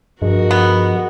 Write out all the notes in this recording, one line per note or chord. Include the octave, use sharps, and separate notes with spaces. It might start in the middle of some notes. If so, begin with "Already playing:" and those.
G2 F3 F#4 G#4 A#4 D#5
B3